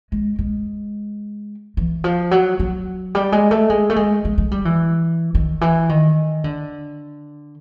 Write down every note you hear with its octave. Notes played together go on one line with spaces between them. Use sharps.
G#3
G#3
E3
F3
F#3
F#3
G3
G#3
A3
G#3
A3
G#3
G#3
G#3
G3
E3
D#3
E3
D#3
D3